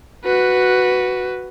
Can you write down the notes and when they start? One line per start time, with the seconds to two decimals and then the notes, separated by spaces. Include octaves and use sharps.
0.25 F#4 B4